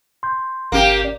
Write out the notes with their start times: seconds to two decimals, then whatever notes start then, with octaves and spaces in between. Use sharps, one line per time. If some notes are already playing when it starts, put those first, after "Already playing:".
0.23 C6 G6
0.72 G1 A#3 C#4 G4
1.05 D5